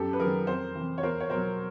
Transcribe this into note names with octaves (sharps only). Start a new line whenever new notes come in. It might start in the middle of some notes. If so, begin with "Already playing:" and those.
Already playing: F#2 G4 A4
B4
D#3 F#3 G#4 A#4
F2 A#4 C5
C3 E3
C#5
E2 A#4 C5
C#5
B2 F#3 A#4 C5